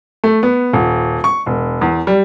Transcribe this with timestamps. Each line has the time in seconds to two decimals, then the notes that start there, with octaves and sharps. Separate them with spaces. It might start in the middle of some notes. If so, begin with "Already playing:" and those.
0.24 A3
0.43 B3
0.73 D#1
1.24 C#6
1.46 E1
1.81 E2
2.07 G3